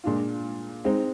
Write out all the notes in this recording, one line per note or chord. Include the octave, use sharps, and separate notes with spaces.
A#2 G#3 D4 F4
G#3 C4 D#4